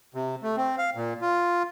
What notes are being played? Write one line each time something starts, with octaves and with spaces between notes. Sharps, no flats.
C3
A3
C4
F5
A#2
F4